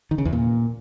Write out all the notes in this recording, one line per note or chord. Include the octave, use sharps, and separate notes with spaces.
D#3
C#3
E2
A#2